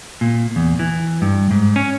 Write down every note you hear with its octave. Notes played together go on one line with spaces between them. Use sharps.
A#2
E2
E3
G2
G#2
C#4